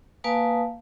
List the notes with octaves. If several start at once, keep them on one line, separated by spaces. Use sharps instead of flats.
A#3 B4 F5 G#5 A5 D#6